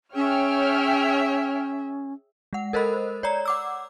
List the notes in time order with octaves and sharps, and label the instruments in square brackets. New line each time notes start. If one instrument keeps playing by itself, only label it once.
[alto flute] C#4 [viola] G#4 E5 [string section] C#5 G5 F6
[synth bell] G#3 F#5
A4 A#4 C5 D#5 B5
C#5 D5 A#5
F#5 D6 E6